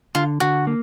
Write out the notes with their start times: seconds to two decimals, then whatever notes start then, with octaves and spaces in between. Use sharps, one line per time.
0.15 D3 F4
0.40 D3 F#4
0.67 A#3